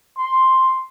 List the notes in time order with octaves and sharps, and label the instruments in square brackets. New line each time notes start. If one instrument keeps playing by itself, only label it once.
[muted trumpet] C6